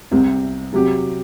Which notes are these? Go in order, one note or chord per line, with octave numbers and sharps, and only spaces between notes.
C2 C3 G3 C4
C3 F#3 C4 G4